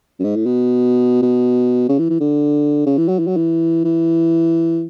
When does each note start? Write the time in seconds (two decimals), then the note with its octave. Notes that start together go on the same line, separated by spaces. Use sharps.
0.19 F#2
0.24 G#2
0.36 A2
0.46 B2
1.22 B2
1.89 C#3
1.99 E3
2.10 E3
2.20 D3
2.86 C#3
2.97 E3
3.08 F#3
3.19 E3
3.27 F#3
3.37 E3
3.84 E3